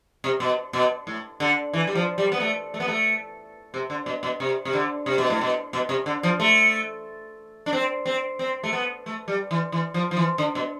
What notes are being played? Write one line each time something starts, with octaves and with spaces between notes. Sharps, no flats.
C3
B2
B2
A2
D3
E3
G3
F3
G3
B3
A3
A3
B3
A3
C3
D3
B2
B2
C3
C3
D3
C3
B2
A2
B2
B2
C3
D3
F3
A3
D4
C4
C4
C4
A3
B3
A3
G3
E3
E3
F3
F3
E3
D3
B2